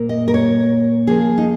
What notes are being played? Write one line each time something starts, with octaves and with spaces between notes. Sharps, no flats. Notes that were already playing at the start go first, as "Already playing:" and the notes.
Already playing: A#2 A#3
D#5
A#4
C#5
C#3 F3 A#3 G#4
D#4